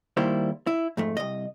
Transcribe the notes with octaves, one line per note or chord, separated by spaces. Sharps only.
D#3 G3 A#3 E4 C5
E4
F2 G#2 A3
C2 D#5